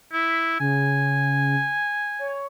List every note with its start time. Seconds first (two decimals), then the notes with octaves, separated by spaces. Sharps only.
0.13 E4 B6
0.60 C#3 G#5
2.19 C#5